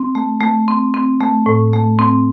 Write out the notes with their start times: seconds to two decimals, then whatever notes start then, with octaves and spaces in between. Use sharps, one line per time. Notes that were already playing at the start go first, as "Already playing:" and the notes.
Already playing: C4
0.15 A3
0.41 A3
0.68 C4
0.94 C4
1.21 A3
1.46 A2
1.73 A3
1.99 C4